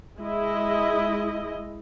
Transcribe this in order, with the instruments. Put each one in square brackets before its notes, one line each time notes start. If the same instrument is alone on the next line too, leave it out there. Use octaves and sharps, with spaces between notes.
[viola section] G#3 E4 D#5